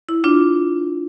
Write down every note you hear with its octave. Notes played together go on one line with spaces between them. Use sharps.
E4
D4 F4